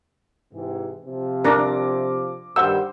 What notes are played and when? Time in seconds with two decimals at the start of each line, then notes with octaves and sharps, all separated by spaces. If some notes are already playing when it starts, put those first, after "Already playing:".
0.53 G#2 C3 E3
1.05 C3 F3
1.45 D4 A#4 D6 A#6
2.56 G2 D#3 G3 C5 F#5 E6